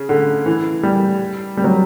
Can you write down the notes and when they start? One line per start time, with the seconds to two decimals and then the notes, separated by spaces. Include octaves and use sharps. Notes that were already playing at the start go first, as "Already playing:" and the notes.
Already playing: C#3
0.09 D3
0.46 E3
0.83 G3
1.57 G3
1.64 F#3